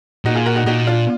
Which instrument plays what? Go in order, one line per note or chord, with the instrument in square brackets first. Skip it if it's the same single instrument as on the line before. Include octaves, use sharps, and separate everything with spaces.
[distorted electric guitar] A#2 [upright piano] D#4 F#4
[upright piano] F4 G#4
F#4 A#4
D#4 F#4
[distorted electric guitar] A#2 [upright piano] D#4 F#4
[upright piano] D4 F4